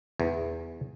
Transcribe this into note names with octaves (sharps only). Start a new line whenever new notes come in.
E2